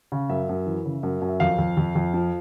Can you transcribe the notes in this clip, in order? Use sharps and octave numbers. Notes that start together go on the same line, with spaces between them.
C#3
F#2 E5
F#2
E3
C#3
F#2
F#2
E5
F2 F5
F2
F2
F2
F3